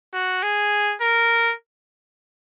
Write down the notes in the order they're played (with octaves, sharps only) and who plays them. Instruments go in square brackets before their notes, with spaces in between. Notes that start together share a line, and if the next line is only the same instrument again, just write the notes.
[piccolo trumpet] F#4
G#4
A#4